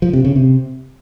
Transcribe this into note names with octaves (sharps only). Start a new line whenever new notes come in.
F3
C3
C#3
C3